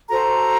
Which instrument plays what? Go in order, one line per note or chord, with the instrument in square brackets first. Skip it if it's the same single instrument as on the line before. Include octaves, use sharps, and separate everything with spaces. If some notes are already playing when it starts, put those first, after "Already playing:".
[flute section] F#4 A4 C5 A#5